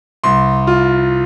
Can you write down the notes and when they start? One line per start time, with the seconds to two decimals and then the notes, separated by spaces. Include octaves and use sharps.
0.24 C2 C6
0.67 F4